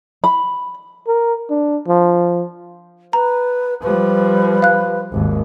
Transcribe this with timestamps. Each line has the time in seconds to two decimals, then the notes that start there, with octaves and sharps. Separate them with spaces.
0.24 B5
1.07 A#4
1.50 D4
1.88 F3
3.13 B4 A#5
3.83 F3 G3 B4
4.62 F5 F#6
5.12 G#1 D#2